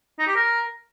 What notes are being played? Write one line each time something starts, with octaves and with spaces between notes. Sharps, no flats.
D#4
G4
A#4